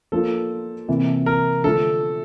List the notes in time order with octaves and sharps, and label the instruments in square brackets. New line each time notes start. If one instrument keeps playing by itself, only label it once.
[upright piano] F3 A#3 D4 F4 [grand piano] A4
[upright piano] C3 E3 A#3
[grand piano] A#4
[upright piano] D3 F3 A3 D4 [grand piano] A4